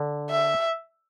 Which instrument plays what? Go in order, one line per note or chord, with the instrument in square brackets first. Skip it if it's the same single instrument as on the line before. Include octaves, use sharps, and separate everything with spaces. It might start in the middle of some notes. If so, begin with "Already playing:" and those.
Already playing: [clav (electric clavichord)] D3
[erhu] E5